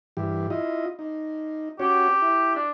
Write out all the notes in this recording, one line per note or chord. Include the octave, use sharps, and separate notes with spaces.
G2 E3 G4
E4 F4 D#5
D#4
C#4 F#4 G4 C#5
E4
D4